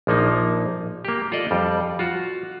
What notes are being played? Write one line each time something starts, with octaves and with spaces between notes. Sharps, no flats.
A#1 F3 A#3 D#4
A#3 G4
F4 A4 D5 D#5
F2 G3
F4 F#4